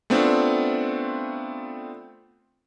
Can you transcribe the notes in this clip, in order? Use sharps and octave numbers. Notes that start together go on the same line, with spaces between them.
A3 B3 C4 D4 F4